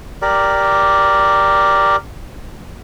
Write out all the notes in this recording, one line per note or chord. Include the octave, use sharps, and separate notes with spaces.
G4 A#4 D5